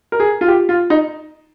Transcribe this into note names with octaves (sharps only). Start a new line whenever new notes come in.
A#4
G#4
F4
G4
F4
D#4